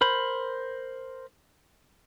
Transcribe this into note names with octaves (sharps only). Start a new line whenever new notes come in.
A#4 C5 B5